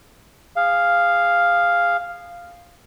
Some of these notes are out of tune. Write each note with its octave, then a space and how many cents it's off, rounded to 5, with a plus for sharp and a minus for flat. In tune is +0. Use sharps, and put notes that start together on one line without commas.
G#4 -25 F5 +0